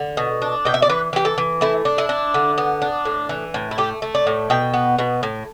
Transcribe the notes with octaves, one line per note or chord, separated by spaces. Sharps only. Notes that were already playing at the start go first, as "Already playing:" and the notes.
Already playing: D3
B2
D4
B2 G5
E5
D5
E3 B4
E3 G4
A4
E3
A3 E4
D4
E4
D4
D3
B3
D4
A2
E3
A2
E4
A3 G4
A3
D5
A2
B2 G5
B3
B2
A2